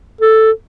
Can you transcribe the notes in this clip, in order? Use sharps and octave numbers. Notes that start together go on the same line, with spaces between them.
A4